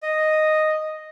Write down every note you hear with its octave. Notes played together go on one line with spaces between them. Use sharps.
D#5